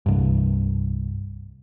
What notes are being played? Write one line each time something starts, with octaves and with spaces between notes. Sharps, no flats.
C2 G2